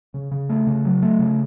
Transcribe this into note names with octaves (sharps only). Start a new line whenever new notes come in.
C#3
C#3
A3
C#3
F#3
A3
C#3